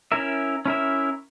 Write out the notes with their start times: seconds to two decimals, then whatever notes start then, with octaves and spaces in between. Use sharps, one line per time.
0.12 C#4 E4 A#4 E5
0.66 C#4 E4 A#4 E5